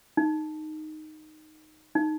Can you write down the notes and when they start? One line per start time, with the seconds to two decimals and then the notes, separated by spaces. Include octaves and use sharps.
0.17 D#4
1.95 D#4